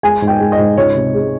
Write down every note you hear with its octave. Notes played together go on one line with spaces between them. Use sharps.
G#3 G#5
G#2
G5
G#3
D#5
G#2
C#2 C#5
C3
G#3